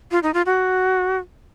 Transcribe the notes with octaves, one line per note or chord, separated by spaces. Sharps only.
F4
D#4
F4
F#4